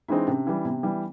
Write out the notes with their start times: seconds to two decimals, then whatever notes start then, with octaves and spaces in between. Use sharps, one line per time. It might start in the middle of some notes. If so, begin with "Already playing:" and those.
0.08 E3 G#3 C4 D4 D#4
0.27 C3 C#4
0.47 E3 G3
0.65 C3 B3
0.83 E3 G3